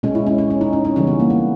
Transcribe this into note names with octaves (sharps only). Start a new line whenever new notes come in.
B2 G#3 C#4
E4
C#4
C#4
C#4
D#4
C#4
C#4
C#3 E3 G3 C#4
B3
A#3
B3